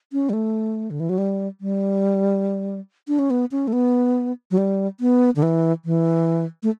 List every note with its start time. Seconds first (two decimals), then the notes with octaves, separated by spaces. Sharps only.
0.12 C#4
0.29 G3
0.33 A3
0.91 D3
1.00 E3
1.09 F#3
1.18 G3
1.61 G3
3.08 D4
3.19 C#4
3.30 B3
3.51 C#4
3.68 A3
3.73 B3
4.51 F#3
4.58 G3
5.00 B3
5.36 D3
5.43 E3
5.85 E3
6.63 A3